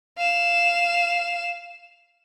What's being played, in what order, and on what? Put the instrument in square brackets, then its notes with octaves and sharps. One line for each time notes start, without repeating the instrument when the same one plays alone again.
[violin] F5 E7